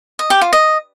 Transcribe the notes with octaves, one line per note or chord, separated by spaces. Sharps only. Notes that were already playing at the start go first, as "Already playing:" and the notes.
D#5
G4
F4
D#5